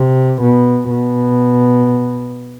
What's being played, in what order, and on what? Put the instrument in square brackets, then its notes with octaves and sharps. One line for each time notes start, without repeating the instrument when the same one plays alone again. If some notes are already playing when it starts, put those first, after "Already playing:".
Already playing: [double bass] C3
B2
B2